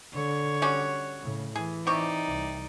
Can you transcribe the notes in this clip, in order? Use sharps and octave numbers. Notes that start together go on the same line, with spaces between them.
D3 C#5
G3 C#4 F#4
A2 C#3
E3 G#4
C3 D#4 G4 D5 C#6
C2